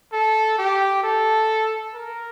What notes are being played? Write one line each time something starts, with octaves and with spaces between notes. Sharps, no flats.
A4
G4
A4
A#4